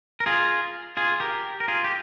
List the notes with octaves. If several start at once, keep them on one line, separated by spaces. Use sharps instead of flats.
A#4
F4 G#4
F4 G#4
G4 A#4
A#4
F4 G#4
G4